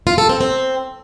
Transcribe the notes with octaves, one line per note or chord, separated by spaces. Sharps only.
F4
A4
C4
C4